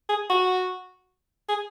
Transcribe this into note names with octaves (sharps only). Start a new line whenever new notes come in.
G#4
F#4
G#4